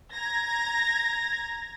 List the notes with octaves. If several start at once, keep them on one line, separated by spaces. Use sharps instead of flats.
A#5 G#6 A#6